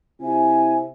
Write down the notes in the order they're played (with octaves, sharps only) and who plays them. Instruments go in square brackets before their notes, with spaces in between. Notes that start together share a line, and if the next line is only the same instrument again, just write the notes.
[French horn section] C3 C4 E4 [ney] G#5